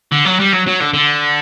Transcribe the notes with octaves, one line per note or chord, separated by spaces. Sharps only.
D3
F#3
G3
F#3
F#3
D3
D3